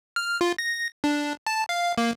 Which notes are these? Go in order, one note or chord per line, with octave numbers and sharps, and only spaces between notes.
F6
F4
A#6
D4
A5
F5
A#3